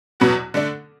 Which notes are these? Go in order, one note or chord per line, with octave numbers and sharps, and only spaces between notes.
E2 B2 F#3 B3 F#4
D3 A3 D4